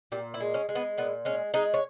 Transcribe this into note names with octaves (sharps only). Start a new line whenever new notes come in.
A#2 G4
E4
G#3
C#4
G#3
B3
A#2 B3
G#3 C#4
G#3 D#4
C#5